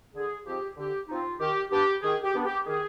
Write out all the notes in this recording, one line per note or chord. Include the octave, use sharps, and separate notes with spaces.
D3 G#4
F3 C4 D#4 G4
D3 G4
F3 C4 D#4 F4
D#3 G4
B3 D4 G4
D#3 G#4
G4
B3 D4
G4
D#3 G#4